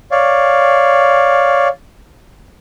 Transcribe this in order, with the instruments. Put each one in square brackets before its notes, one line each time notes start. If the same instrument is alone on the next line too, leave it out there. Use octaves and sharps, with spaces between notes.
[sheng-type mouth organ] C#5 D5 F5